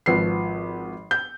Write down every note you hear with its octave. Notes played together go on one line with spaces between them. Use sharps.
G#1 F3 B4 C7
G6